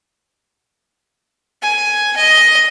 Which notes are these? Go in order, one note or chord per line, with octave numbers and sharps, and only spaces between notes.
G#5
D#5